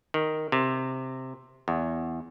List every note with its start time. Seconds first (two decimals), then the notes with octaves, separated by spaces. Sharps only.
0.14 D#3
0.52 C3
1.68 E2